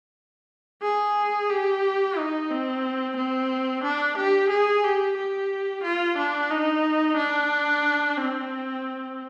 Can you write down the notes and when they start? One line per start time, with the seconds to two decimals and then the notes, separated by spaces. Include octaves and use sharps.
0.82 G#4
1.50 G4
2.17 D#4
2.50 C4
3.16 C4
3.83 D4
4.17 G4
4.50 G#4
4.84 G4
5.17 G4
5.83 F4
6.18 D4
6.50 D#4
7.17 D4
8.17 C4